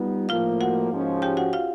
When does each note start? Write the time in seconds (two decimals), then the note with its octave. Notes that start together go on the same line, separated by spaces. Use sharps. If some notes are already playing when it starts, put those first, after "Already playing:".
Already playing: G3 B3 D#4 F4
0.29 A2 F3 A#3 F4 F5
0.61 F#4 F#5
0.90 G#2 F3 G#3 C#4
1.22 G4 G5
1.37 F#4 F#5
1.53 F4 F5